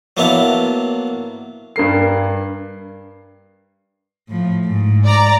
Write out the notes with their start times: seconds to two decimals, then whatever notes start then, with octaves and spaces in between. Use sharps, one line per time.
0.17 F#3 A#3 B3 D4 E4
1.76 G2 A#4 C7
4.29 A2 F3
4.65 G#2
5.06 D5 A#5